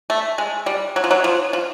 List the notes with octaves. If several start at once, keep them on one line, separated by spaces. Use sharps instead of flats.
A3
G#3
G3
F#3
F3
F#3
F3
F3